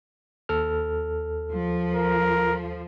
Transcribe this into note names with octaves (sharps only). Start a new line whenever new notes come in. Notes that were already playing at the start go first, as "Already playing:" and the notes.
D#2 A4 F6
F3
A#4